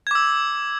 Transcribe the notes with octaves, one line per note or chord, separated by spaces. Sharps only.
D6 E6 G#6